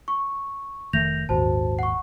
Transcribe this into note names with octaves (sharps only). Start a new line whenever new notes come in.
C#6
F1 D#3 A3 G6 A#6 F7
G#1 D#2 A#2 F#4 C5 A5
F#5 C#6